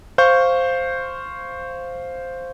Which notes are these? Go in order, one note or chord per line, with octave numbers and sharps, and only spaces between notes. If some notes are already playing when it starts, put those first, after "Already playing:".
C5 F5 C#6 G6